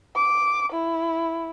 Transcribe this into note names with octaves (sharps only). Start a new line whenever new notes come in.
D6
E4